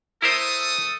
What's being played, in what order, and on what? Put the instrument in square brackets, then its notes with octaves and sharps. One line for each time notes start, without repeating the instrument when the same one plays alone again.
[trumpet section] A3 A4 D#6 [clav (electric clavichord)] E4 A#4 C5